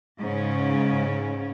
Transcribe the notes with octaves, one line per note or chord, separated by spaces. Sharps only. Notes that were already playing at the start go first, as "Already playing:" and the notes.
G#2 C#3 C#4